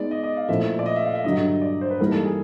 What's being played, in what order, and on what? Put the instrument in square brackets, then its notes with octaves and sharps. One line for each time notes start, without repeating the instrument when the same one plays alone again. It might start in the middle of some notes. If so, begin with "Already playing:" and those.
Already playing: [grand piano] G#3 B3 D#4 [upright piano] D5
[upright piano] D#5
D#5
F5
[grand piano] A#2 F3 A3 C#4 E4 [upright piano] E5
[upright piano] D5
D#5
E5
F5
E5
[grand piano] G2 D3 F#3 [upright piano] D#5
[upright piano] D5
C5
B4
[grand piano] E3 G3 A#3 D#4 [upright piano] A#4
[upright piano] A4
G#4